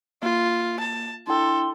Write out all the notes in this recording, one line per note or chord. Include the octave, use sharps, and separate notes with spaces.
A#3 F4
A5
D4 E4 A4 G5 C6